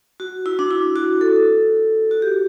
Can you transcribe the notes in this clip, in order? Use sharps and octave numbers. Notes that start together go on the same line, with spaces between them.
F#4
E4
D4
E4
F#4
A4
F#4
G4